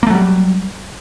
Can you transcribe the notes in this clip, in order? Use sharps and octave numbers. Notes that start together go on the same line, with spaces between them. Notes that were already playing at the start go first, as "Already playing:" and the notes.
F#3 G3 A3 A#3